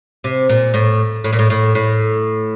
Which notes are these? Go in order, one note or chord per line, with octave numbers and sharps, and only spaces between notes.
C3
A#2
A2
A2
A#2
A2
A2
A2